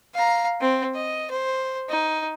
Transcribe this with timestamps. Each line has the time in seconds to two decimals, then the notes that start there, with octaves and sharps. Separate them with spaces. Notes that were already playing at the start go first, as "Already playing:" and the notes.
0.14 F5 A#5
0.61 C4
0.95 D#5
1.30 C5
1.89 D#4